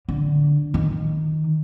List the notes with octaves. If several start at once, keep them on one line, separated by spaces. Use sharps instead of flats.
D3
D#3